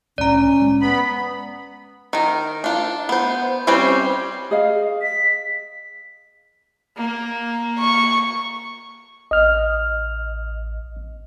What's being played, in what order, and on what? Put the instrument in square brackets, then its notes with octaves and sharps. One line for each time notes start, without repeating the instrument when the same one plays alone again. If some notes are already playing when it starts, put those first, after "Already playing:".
[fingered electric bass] C2 A2 D4 [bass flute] C#4 [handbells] D5 A#5
[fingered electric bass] G#3
[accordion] B3 B5
[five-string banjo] D#3 A#4
D4 F4
B3 C5
G3 C4 C#4 B4 C5
[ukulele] G#4 D#5 F5
[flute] B6
[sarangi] A#3
[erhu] C#6
[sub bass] A1 [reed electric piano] D#5 F6